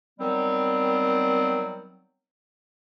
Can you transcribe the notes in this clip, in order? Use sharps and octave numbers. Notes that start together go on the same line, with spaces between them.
D#3 F#3 G3 B3 C4